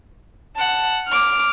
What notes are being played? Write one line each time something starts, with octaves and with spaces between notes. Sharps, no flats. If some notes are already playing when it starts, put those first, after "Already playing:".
F#5 A5
D6 F6